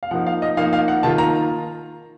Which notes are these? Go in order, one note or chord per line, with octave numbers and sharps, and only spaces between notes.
F5
F3 A#3 D#4 F#5
F5
D#5
F3 A#3 D#4 F5
F5
F#5
D#3 A#3 F4 A5
A#5